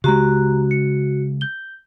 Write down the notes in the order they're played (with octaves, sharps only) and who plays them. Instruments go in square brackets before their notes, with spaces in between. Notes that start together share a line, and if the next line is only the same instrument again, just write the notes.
[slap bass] C#3 G#3 [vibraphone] F#4 [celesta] G4 A#5 F#6
[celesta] C#7
G6 G7